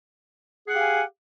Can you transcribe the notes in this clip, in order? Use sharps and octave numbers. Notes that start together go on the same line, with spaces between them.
G4 G#4 F5 F#5 G#5